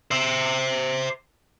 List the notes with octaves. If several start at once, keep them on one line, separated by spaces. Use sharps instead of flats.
C5 E5